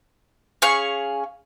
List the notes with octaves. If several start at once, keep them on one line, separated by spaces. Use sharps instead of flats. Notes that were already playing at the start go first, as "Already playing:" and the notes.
C#4 G#4 F5 C#6